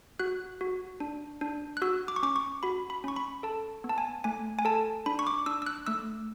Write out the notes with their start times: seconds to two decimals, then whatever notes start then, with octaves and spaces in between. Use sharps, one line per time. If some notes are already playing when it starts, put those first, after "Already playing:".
0.19 F#4 F#6
0.61 F#4
1.00 D4
1.41 D4
1.77 F#6
1.82 F#4 E6
2.08 D6
2.16 C#6
2.23 C#4 D6
2.36 C#6
2.63 F#4 B5
2.90 B5
3.04 C#4 C#6
3.16 B5
3.43 A4 A5
3.84 B3
3.89 A5
3.98 G#5
4.24 A3 G#5
4.59 G#5
4.65 A4 A5
5.06 D4 B5
5.19 C#6
5.27 D6
5.46 D4 E6
5.62 E6
5.66 F#6
5.87 A3 E6